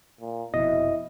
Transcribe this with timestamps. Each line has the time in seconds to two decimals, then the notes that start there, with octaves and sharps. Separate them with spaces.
0.20 A#2
0.54 F1 F2 B2 E4 D#5